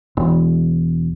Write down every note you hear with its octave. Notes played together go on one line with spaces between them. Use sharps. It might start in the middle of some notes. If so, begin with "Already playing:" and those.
E1